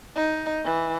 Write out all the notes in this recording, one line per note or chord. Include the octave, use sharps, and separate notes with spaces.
D#4
E3